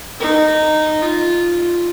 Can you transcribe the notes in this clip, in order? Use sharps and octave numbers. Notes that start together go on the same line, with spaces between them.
D#4
F4